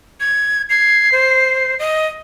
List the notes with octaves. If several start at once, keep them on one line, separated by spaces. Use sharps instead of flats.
G#6
G#6 C7
C5
D#5